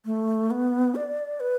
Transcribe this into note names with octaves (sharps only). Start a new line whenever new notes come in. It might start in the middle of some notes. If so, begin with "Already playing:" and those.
A3
B3
D5
B4